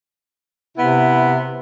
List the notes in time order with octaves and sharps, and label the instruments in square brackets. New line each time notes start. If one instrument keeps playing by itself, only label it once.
[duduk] C3 [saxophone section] B3 E4